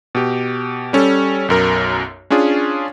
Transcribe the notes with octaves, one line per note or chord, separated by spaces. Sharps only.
B2 G4
G3 C#4 A4
B1 F#2 A#4
C#4 D4 F4 G#4